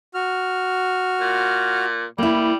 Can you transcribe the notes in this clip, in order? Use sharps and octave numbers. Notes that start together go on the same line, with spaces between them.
F#4 F6
A#2
G3 A#3 E4